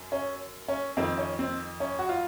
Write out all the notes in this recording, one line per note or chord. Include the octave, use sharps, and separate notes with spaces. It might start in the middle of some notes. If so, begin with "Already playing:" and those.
Already playing: F#2
C#4
C#4
F2 D#3 C4
C#4
C4
C#4
F#4
F4